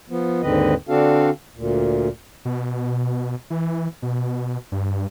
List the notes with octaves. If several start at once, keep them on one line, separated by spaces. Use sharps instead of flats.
F3 B3
D#2 G#2 D3 C4 B4 D#5
D3 C4 D4 F#4 A4 F5
D2 A#2
B2
E3
B2
G2